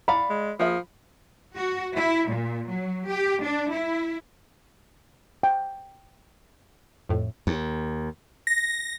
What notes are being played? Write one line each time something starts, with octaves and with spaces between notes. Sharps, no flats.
D5 F5 F#5 B5
G#3
F3 A#3 G#4 E5
F#4
E4
A#2
F#3
G4
D4
E4
G5
F2 A2
D#2
A#6